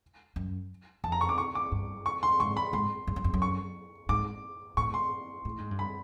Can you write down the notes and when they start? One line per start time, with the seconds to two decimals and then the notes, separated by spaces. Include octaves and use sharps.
0.36 F#2
1.04 F2 A5
1.12 A#5
1.21 C#6
1.29 D6
1.38 C#6
1.55 D6
1.72 G2
2.06 C#6
2.23 C6
2.40 G#2 C#6
2.57 B5
2.73 G#2 C6
3.07 G2
3.16 F#2
3.24 F2
3.34 F#2
3.42 C#6
4.09 G#2 D6
4.77 A2 C#6
4.94 C6
5.45 A2
5.58 G#2
5.71 G2
5.79 B5